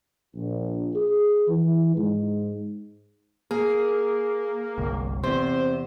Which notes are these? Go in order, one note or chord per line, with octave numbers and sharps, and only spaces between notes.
A#1
G#4
E3
G#2
A#3 G#4
G1 C2
E2 C3 C5